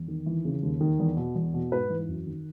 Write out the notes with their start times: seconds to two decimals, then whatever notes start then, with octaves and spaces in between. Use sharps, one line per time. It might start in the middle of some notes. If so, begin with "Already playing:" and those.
Already playing: E2
0.08 D#3
0.26 E3
0.45 C#3
0.63 D#2
0.81 D#3
0.99 E2
1.17 B2
1.35 E2
1.54 B2
1.72 G#2 B4
1.90 E3
2.08 F#2
2.27 D#3